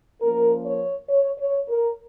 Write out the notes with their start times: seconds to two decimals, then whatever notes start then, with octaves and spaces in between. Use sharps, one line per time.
0.22 F3 A#3 C#4 A#4
0.66 C#5
1.09 C#5
1.39 C#5
1.68 A#4